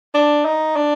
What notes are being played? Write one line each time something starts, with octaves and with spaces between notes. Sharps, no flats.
D4
D#4
D4